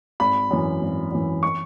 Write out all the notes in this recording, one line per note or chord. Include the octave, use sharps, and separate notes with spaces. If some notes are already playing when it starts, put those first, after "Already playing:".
G#1 B5
F#2 E3
G#1
F#2 E3
C#6